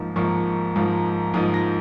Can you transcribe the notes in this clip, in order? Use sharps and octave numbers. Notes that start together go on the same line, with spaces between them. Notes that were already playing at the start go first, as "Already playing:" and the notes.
Already playing: G#2 F3 A#3 D#4
G#2 F3 A#3 D#4 C#6
G#2 F3 A#3 D#4
G#2 F3 A#3 D#4 D#6
A#6